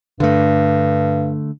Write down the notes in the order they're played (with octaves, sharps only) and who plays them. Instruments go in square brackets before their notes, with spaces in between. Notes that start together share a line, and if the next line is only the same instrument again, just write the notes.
[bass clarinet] G2 [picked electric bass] D3 A3